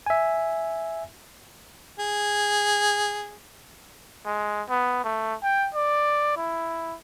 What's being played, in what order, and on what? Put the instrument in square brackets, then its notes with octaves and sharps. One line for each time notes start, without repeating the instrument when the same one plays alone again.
[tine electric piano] E5 G#5
[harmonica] G#4
[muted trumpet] G#3
B3
A3
G5
D5
E4